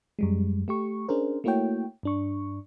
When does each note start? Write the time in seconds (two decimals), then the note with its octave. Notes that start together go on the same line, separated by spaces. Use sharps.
0.19 F#2 G3 G#3
0.68 A3 G4 C#6
1.09 C#4 D4 G#4 A#4 C5
1.44 A3 A#3 E4 F#4 C#5 G5
2.03 G2 D4 C#6